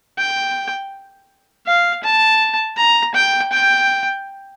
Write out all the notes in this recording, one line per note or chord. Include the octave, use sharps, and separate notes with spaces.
G5
F5
A5
A#5
G5
G5